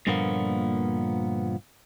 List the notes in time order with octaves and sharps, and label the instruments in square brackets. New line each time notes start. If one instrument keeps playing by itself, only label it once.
[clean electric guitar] G2 A#2 D3 F3 A#3 B3